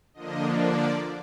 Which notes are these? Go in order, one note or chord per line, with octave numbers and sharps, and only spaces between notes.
D3 F3 A#3 D4 D#5
D5